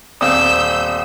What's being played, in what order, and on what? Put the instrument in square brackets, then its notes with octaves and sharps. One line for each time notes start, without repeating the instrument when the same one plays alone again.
[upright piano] D#1 C4 D#6 [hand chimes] D5 F5 [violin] E6 G6